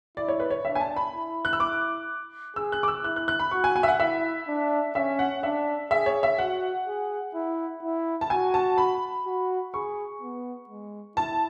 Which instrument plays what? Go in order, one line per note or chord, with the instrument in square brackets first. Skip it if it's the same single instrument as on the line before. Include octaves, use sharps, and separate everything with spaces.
[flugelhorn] E4 [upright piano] D5
[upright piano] C#5
B4
C#5
[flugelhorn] D4 [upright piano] E5
[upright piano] G#5
A5
B5
[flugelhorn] E4
[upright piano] F#6
E6
D6
[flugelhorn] G#4 [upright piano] E6
[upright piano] F#6
D6
E6
[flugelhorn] E4 [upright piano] F#6
[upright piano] F#6
F#6
B5
[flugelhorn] F#4 [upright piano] C#6
[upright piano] G#5
G#5
E5
F#5
[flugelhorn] E4 [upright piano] E5
[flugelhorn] D4
[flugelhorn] C#4 [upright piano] E5
[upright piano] F#5
[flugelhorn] D4 [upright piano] E5
[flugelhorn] G#4 [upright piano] E5
[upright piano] C#5
E5
[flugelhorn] F#4 [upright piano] F#5
[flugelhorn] G#4
E4
E4
[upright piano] A5
[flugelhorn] F#4 [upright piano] G#5
[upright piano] A5
B5
[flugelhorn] F#4
[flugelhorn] G#4 [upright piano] C#6
[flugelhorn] B3
G#3
[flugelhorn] E4 [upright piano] A5